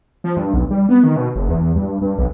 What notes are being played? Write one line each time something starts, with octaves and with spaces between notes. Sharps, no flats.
F3
G2
B1
G3
B3
D#3
B2
F#1
E2
G2
G2
B1